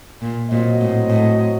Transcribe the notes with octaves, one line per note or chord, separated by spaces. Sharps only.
A#2
A#2 F#3 C4 F#4 C5 D#5
A2
A2